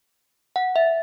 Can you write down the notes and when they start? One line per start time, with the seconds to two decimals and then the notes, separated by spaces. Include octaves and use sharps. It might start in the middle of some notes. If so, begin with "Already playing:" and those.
0.56 F#5
0.76 E5